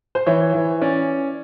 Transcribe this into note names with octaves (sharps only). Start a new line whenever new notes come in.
C5
E3 C#5
E3
C#4 D5